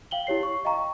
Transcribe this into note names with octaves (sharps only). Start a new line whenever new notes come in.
F5 G5 F#7 G7
E4 G4 C#5 C7
C#6
D#5 F5 G5 A#5 C#6